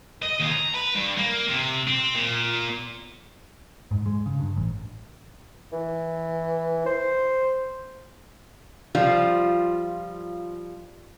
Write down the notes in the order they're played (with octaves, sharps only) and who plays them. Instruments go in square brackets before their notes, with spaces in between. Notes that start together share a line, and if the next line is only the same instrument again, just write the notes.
[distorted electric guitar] D#5
D#2
A#5
B4
G2
A#3
C3
C4
A#2
[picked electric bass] G#2
G#3
C#3
G2
A1
[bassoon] E3
C5
[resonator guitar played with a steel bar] F3 G3 F4